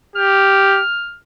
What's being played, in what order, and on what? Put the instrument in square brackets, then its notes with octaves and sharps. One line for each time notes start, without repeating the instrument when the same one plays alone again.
[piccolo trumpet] G4 [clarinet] F6